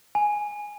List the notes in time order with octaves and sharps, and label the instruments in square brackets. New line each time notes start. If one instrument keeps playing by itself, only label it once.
[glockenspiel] G#5